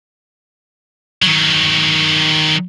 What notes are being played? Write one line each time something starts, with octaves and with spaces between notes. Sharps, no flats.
D#3 F#3